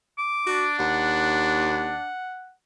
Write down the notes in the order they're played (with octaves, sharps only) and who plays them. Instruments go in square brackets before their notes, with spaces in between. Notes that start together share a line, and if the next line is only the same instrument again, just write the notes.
[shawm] D6
[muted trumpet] D4 [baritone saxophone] F#4
[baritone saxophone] D#2 [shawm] F#5